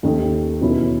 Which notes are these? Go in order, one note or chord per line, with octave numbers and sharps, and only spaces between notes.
D#2 D#3 A3
E2 B2 F#3 C#4 E4